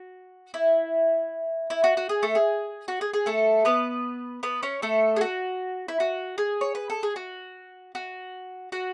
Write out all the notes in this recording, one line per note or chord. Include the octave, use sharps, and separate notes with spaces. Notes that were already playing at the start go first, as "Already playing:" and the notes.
Already playing: F#4
E4
E4
F#4
F#4
G#4
A3 A4
G#4
F#4
G#4
G#4
A3 A4
B3 B4
B3 B4
C#4 C#5
A3 A4
G#4
F#4
E4
F#4
G#4
C#5
B4
A4
G#4
F#4
F#4
F#4